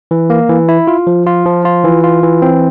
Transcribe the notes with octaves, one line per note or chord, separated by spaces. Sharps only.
E3
A#3
E3
E4
F4
F3
F4
F3
F4
E3
F4
E3
C4